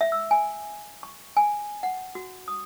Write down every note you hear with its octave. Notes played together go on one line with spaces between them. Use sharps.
E5
E6
G#5
C#6
G#5
F#5
F#4
D#6